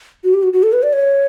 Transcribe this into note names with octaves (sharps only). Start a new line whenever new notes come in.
F#4
G4
F#4
F#4
A4
B4
D5
C#5